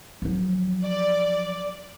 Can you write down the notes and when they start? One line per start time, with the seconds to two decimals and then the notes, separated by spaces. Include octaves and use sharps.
0.22 F3 F#3
0.84 D5